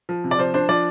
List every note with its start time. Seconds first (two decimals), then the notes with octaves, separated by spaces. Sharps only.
0.09 F3
0.24 C3
0.31 D5
0.38 F3 C5
0.54 D4 C5
0.69 F3 D5